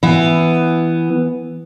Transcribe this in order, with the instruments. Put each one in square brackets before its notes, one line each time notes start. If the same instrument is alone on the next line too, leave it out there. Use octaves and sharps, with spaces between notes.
[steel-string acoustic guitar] E3 B3